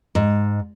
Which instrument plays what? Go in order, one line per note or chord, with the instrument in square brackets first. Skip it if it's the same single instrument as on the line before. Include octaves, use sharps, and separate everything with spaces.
[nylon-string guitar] G#2